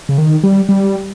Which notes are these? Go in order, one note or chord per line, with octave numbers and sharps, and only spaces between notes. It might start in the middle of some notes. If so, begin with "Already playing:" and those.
C#3
D#3
G3
G3